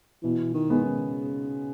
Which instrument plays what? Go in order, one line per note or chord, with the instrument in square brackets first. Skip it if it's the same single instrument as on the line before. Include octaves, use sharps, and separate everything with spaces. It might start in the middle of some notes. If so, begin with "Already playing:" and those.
[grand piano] B2 [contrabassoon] E3
[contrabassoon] D#3
[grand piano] G#3 B3
[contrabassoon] C#3